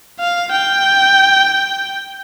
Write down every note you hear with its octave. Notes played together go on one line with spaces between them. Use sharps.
F5
G5